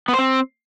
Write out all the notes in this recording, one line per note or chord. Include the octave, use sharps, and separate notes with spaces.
B3
C5
C4